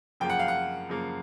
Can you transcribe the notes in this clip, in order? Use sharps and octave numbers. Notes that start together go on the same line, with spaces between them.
F#2 C#3 F3 A#3 G5
F#5
F5
F#5
F#2 C#3 F3 A#3